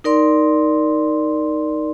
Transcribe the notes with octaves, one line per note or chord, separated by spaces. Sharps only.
D#4 A#4 D5 C6